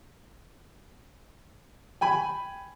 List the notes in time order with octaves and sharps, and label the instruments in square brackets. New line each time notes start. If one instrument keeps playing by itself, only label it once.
[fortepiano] G5 G#5 B5